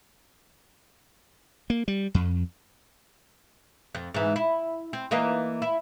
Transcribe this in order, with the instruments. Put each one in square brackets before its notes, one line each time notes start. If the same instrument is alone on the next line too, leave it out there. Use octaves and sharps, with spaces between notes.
[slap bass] A#3
G3
F2
[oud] F2
G#2 E3
E4
C4
E3 A#3 D#4
E4